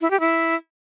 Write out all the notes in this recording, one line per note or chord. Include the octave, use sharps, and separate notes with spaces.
E4
G4
E4